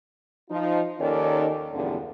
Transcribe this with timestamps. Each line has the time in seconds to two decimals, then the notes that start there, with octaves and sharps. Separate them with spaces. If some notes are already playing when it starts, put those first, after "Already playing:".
0.50 F3 D#4 F4
1.00 D#2 D#3 C#4 D#4 A4 D5
1.73 E2 G2 A#2 D3 F3 C4